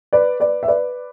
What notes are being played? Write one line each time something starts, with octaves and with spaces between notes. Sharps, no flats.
B4 D5
B4 D5
E5
B4 D5